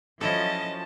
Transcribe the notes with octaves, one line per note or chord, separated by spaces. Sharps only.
F3 F#3 C#4 E4 A4 D#5 A5